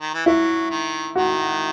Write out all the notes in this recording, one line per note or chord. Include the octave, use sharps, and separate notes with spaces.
D#3
E3
F#3 E4
D#3
D#3 F#4